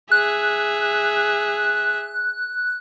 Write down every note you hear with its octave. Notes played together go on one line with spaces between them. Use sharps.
G#4 E5 F#6